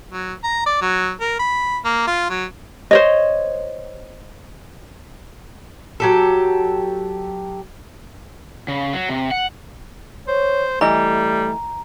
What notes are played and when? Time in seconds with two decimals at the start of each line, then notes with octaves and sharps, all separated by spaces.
0.12 F#3
0.44 A#5
0.66 D5
0.81 F#3
1.21 A#4
1.39 B5
1.85 A#3
2.07 F4
2.30 F#3
2.91 C5 C#5 D#5
6.00 F#3 G4 A4
8.68 C#3
8.93 F#3
9.09 C3
9.31 F#5
10.28 C5 C#5
10.81 E3 G3 A3 D#5 A#5